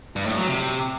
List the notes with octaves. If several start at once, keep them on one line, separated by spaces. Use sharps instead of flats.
G2
A2
F#3
C3